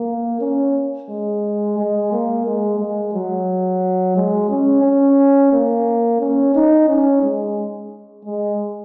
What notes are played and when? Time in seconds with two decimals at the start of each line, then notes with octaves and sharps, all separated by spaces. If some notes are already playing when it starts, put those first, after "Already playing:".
Already playing: A#3
0.41 C#4
1.09 G#3
1.78 G#3
2.12 A#3
2.46 G#3
2.80 G#3
3.14 F#3
4.16 G#3
4.50 C#4
4.84 C#4
5.53 A#3
6.21 C#4
6.55 D#4
6.89 C#4
7.23 G#3
8.25 G#3